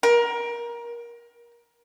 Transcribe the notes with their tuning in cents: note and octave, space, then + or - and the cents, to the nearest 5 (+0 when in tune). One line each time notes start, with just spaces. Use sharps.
A#4 +20